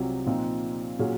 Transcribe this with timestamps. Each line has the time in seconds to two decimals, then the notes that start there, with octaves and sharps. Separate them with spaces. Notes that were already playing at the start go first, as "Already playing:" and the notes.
Already playing: C2 C3 F#3 C4 F4
0.26 A#2 F3 C4 D#4
0.99 A#2 F#3 C#4 G#4